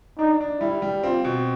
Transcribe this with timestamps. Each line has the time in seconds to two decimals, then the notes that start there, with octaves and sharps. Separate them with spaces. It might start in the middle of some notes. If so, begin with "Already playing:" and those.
0.19 D4 D#4
0.41 D4
0.61 G3 E4
0.82 G3
1.03 C4 F4
1.25 B2